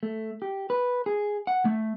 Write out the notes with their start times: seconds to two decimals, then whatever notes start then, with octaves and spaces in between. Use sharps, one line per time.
0.03 A3
0.42 G4
0.70 B4
1.06 G#4
1.47 F#5
1.65 A3